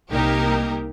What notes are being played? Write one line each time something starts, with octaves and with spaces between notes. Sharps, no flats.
C2 A#3 D#4 G4 A#4